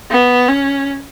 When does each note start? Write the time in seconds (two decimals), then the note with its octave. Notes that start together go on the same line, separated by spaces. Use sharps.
0.11 B3
0.48 C#4